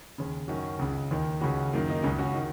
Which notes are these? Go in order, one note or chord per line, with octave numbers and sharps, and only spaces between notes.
D#2 C#3
F#2 D#3 C#4 F#4
C#2 C#3
D#2 D#3
C#2 C#3 C#4 F#4
F#2 D#3 A#3
A#3 D#4
C#2 C#3 G#3 C#4
C#4 F#4
D#3